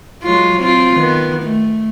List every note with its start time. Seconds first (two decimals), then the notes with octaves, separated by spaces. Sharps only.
0.23 F#3 G#3 F4
0.59 C4 F4
0.95 D#3 B3
1.43 A3